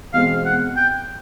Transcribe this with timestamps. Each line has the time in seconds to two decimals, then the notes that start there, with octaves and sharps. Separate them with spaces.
0.14 E2 B2 G#3 C4 F5
0.46 F#5
0.77 G5